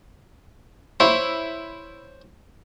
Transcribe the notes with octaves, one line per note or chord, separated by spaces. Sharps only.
E4 C5 C#5 E5